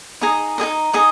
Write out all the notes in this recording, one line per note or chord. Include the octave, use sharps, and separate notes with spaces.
D#4 G#4 D#5 A#5
D#4 G#4 D#5 A#5
D#4 G#4 D#5 A#5